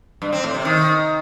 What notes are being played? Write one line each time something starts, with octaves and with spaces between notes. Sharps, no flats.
G2
C4
A2
C3
D#3